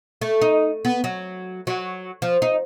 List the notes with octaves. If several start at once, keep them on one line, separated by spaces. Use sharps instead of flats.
A3
D#4
B3
F#3
F#3
F3
D#4